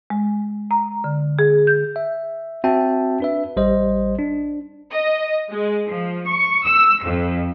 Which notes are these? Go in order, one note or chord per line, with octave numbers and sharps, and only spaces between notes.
G#3
A#5
D3
G#4
G6
E5
C4 F#4 E5 G5 A5
D4 B4 E5
A1 G3 C5 D#5
D4
D#5
G#3
F3
C#6
E6
F2